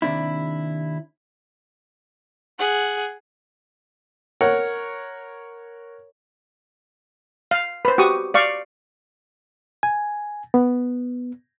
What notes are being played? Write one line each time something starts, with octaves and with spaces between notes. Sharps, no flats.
D#2 C3 D4 E4
G#4 F#5
A#4 C#5 F#5
F5
B4 C5
F#4 G4 C#6 D#6
D5 F5 C#6
G#5
B3